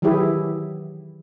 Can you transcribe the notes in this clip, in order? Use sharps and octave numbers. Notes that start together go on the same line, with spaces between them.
D#3 E3 F#3 E4 G4 G#4